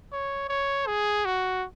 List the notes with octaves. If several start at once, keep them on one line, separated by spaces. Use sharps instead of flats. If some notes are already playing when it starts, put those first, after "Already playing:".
C#5
C#5
G#4
F#4